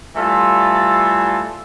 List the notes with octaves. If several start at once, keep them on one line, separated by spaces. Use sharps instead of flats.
E3 G3 A3 F4 A4